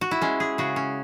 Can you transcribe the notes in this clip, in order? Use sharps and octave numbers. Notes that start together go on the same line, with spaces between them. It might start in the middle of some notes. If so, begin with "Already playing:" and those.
F#4
E4
G#3 C#4
G#4
C#3 F#4
C#4